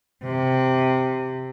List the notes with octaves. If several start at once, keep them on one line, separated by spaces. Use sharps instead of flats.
C3